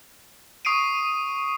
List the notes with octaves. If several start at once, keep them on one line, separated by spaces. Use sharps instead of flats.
C#6 D#6 C7 D7 D#7